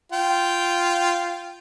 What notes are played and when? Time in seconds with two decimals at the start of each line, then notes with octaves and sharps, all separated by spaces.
0.12 F4 G5